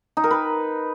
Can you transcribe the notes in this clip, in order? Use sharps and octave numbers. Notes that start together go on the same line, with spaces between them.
D#4
A#4
B4